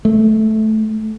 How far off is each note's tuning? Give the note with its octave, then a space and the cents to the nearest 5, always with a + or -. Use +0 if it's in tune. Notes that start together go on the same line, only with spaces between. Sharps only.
A3 -10